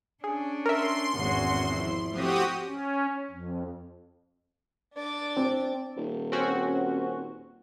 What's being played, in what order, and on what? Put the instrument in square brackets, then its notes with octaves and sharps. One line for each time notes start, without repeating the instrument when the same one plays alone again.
[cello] C#4 D4 [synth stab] G#4
[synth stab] A#4 E5 [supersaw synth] C6
[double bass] G#1 E2 [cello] C#4 F#4
[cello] F3 E4
[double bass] F3 C4 [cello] A3 [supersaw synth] F#4 G4 D#6
[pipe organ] C#4
F2
[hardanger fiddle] D4 D5
[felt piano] C4
[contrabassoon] D#1
[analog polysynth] C4 C#4 F#4